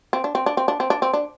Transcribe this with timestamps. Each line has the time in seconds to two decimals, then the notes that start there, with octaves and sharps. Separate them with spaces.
0.13 C4
0.24 D4
0.35 C4
0.46 D4
0.57 C4
0.68 D4
0.80 C4
0.90 D4
1.02 C4
1.13 D4